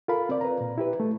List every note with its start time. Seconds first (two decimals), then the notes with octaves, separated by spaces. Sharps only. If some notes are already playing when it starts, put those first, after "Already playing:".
0.08 F4 A4 A#4 F5 B5
0.29 C4 D5
0.41 B4 A#5
0.61 A#2
0.78 E4 G4 B4
1.00 A3